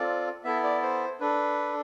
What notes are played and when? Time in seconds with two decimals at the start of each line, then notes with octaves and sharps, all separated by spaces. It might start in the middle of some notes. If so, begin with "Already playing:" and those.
Already playing: C4 F4 A4 D5
0.44 B3 E4 A4 E5
0.64 D5
0.82 C5
1.20 D4 A4 B4